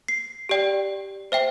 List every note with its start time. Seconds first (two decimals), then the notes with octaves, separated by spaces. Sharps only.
0.08 C7
0.49 G4 D5 G5
1.32 C5 E5 G5